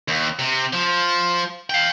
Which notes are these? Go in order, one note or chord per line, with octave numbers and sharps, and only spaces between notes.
D#2
C3
F3
F5 G5